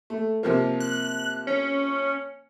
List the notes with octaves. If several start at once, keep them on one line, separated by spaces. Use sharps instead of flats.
A3
C3 F3 A#3
F#6
C#4